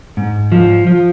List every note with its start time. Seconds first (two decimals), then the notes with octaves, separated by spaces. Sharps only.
0.17 G#2
0.52 F3
0.87 F3